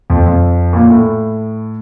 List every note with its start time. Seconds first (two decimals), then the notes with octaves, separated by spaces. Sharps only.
0.10 F2
0.26 F2
0.73 A#2
0.90 A2